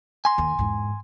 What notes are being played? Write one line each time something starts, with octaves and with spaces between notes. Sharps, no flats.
G#5 C6
D#2
E2 G#2